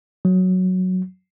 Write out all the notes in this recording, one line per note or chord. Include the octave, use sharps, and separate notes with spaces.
F#3